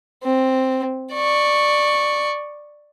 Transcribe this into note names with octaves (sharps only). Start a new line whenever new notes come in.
C4
D5 C#6